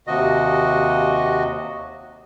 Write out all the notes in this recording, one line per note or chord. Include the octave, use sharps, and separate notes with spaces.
D#2 C3 F#4 D#5